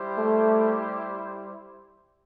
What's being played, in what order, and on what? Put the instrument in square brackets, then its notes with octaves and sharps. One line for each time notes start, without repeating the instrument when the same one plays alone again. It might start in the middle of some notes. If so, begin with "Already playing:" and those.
Already playing: [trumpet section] G3 E4 G4 C5
[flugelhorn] A3